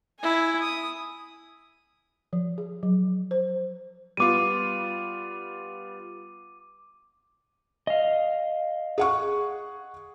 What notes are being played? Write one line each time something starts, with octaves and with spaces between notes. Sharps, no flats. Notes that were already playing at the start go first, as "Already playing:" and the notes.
E4 G#5
D#6
F3
G#4
F#3
C5
G3 B3 F4 D6 D#7
D#5 F5
G#4 F#5 C#6